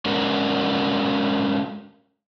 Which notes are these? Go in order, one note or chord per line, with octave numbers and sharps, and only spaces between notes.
G#3 C#4 D4 F#4 A4 A#4